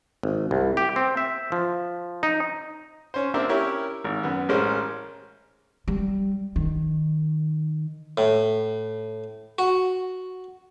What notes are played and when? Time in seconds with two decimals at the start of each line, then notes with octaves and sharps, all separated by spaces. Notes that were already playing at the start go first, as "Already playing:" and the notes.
0.23 G#1
0.51 C2
0.77 G4
0.96 C4
1.17 E5
1.52 F3
2.23 D#4
3.14 C#4 C5
3.34 A#3 C4 D4 A#4 C5 E5
3.49 C#4 E4 G4 A#4 C#5
4.04 G#1
4.23 F#2 B3
4.49 A1 G#3 C#4 A#4 C5
5.88 G3
6.56 D#3
8.18 A2
9.59 F#4